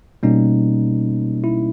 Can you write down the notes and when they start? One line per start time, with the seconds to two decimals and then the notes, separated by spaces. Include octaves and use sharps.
0.23 B2 G3 A#3 C#4 D#4
1.44 E4